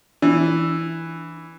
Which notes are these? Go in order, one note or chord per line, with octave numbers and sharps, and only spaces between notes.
E3 D4